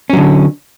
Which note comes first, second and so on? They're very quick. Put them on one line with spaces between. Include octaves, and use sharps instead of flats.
C#4 F#3 D3